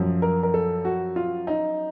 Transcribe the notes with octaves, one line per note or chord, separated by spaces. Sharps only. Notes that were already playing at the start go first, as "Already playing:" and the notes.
Already playing: F#2 F3
A#4
A#4
A4
F#4
F4
D#4